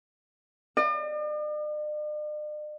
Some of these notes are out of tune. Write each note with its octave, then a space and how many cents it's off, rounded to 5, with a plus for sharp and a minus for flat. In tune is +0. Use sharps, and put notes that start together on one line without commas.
D5 +45